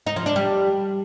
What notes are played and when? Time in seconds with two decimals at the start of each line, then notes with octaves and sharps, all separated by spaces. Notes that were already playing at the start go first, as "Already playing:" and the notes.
0.07 D#4
0.16 F3
0.26 D4
0.36 G3